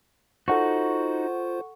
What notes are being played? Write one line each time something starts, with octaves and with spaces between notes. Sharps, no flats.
D#4 F4 F#4 A4 C5 F#5 C#6